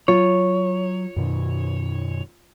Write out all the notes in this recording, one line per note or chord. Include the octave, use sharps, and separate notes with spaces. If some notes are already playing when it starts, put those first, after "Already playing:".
F#3 F4 C#5
F#2 B2 D#3